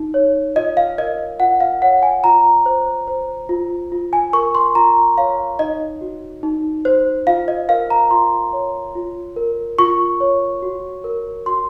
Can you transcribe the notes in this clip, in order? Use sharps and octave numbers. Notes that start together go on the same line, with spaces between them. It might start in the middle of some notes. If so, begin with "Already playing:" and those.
Already playing: D#4
C#5
F4 D#5
F5
A#4 D#5
F4 F#5
F5
C#5 F#5
G#5
F4 A#5
C5
C5
F4
F4
G#5
A#4 C#6
C6
F4 A#5
C#5 F5
D#4 D#5
F#4
D#4
C5
F4 F5
D#5
A#4 F5
A#5
F4 C6
C#5
F4
A#4
F4 C#6
C#5
F#4
A#4
F#4 C6